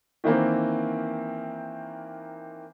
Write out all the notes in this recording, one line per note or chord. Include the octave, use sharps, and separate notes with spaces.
D#3 E3 A#3 C4